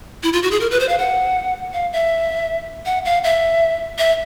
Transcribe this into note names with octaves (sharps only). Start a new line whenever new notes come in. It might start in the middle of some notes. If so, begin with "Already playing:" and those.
E4
F4
F#4
G#4
A#4
B4
C5
F5
F#5
F5
E5
F#5
F5
E5
E5